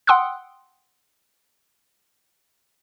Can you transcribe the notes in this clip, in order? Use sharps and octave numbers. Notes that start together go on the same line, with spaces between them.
F#5 G5 C6 D#6 E6 F#6